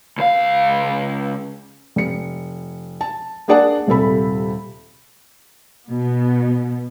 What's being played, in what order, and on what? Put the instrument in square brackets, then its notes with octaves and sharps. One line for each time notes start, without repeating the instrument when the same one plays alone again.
[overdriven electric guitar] C#2 F5
[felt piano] F1 C#7
A5
A#3 D4 G#4 D5 F#5 A5
D#1 C3 A4 B5
[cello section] B2 B3